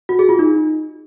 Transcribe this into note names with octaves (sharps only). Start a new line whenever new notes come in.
F#4
G#4
F4
D#4